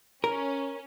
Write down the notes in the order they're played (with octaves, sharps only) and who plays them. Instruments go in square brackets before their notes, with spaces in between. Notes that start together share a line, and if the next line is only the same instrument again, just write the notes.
[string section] C#4 [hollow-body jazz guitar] A#4